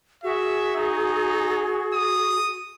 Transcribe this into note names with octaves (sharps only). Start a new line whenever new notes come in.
F#4 G#4 E5
D#4
D#6